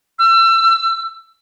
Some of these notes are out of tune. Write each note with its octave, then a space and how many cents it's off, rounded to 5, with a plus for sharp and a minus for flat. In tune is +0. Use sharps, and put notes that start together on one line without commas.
E6 +30